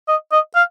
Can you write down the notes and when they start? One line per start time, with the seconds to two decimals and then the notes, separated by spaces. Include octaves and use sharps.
0.08 D#5
0.32 D#5
0.55 F5